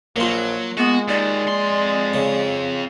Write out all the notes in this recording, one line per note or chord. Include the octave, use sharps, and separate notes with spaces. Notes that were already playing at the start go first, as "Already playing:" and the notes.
A#1 F#3 A#3 F4
G#3 B3 F#4
D#2 D#3 D5
F2 C6
C#3